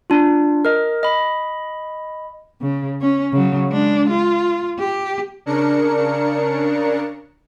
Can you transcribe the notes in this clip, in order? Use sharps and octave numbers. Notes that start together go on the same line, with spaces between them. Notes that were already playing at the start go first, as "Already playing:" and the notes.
D4 F4
A#4 D#5
D#5 B5
C#3
C#4
C#3 F#3
G#3 D4
F4
G4
C#3 D4 A#4 C#7